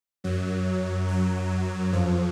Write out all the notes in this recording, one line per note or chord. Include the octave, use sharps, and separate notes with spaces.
F#2 F#3
F#2 F#3
F2 F3